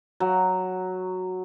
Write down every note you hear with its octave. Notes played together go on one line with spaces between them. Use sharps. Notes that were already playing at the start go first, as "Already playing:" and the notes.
F#3